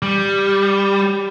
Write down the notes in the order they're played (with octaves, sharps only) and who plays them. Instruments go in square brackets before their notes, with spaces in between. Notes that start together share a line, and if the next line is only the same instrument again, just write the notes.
[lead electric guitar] G3